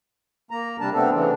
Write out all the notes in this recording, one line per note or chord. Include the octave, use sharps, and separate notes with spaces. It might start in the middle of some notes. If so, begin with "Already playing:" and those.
A#3 A#5
C3 G3 D4 A5
A3 B3 C4 D4 A4
C#3 E3 D4